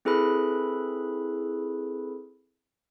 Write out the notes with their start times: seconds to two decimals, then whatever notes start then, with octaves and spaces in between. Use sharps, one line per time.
0.05 C4 E4 G#4 A4 B4 B5